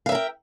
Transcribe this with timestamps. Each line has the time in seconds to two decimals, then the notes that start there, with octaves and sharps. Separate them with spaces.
0.06 F5
0.09 E5
0.12 A#4
0.15 G5